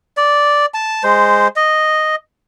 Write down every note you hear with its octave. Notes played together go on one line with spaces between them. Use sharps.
D5
A5
G#3 C5
D#5